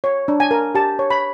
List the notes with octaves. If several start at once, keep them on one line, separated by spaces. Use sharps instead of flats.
C#5
D4
G#5
A#4
G4 A5
C#5
B5